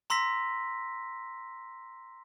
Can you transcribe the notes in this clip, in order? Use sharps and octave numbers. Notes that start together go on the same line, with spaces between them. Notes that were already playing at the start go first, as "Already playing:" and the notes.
A#5 C6 E6 A#6 B6